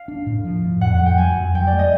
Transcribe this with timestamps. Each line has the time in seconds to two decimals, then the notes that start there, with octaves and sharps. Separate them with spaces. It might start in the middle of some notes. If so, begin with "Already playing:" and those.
Already playing: F5
0.08 D4
0.27 A2
0.45 F3
0.64 A2
0.81 F2 F#5
0.94 F#5
1.00 F#3
1.06 G5
1.18 F#3 G#5
1.37 F2
1.54 F#3 G5
1.67 D5
1.73 A3
1.79 D#5